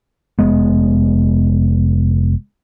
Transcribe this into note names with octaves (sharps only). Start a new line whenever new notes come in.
F1 G#3 B3